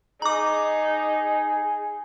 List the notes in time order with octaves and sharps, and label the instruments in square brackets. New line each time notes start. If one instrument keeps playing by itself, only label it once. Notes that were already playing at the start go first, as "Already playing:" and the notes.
[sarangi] D#4 [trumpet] G#4 [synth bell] A#5 D6